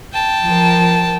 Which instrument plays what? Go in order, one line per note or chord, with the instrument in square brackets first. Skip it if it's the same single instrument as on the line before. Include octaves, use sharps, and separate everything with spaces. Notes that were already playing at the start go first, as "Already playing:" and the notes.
[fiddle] G5 A5
[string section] F3 A#4